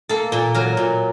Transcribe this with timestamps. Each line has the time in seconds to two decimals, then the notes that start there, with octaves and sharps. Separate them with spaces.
0.09 A#3 A4
0.32 A#2
0.54 F#3 A#4
0.77 A#2